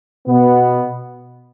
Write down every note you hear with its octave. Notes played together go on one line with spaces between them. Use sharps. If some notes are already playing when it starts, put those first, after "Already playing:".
B2 B3